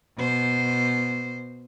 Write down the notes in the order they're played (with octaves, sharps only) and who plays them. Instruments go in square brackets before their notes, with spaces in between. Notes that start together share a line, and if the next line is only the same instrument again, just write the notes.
[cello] B2 C5